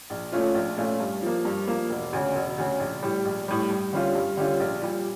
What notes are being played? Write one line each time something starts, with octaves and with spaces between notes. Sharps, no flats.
A#1
A#2 A3 C#4 F4
A#1
A#2 A3 C#4 F4
G2
F3 A#3
G2
F3 A#3
E1
D2 C#3
E1
D2 C#3
A#1
A2 G3
A#1
A2 G3
G2
D3 G3 C#4 F4
G2
D3 G3 C#4 F4
A#1
A#2 G3